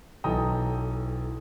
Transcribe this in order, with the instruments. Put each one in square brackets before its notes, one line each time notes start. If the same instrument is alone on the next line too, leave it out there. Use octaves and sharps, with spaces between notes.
[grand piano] B1 E3 A4 G5 A#5 D#6